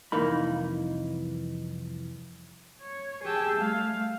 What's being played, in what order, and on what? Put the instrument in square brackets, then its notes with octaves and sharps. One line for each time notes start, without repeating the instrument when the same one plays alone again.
[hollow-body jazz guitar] C2 F2 E3 A#3 D#4 B5
[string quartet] C#5
G4 G#4 G5 A5 E6
G3 A3 F5